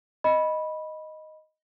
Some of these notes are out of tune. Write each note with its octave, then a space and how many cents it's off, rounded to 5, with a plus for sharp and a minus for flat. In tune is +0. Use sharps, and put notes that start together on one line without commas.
D#5 +0 B5 -10